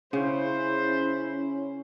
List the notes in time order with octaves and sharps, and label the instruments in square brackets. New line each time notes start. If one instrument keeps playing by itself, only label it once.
[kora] C#3 [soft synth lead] C#4 [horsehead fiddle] E4 [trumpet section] C5